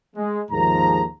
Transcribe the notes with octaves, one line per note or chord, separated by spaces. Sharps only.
G#3
D#2 G#2 F3 A#5